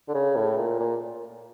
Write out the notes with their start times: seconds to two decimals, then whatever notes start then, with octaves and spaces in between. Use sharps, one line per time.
0.08 D3
0.14 C#3
0.36 A2
0.57 A#2
0.79 A#2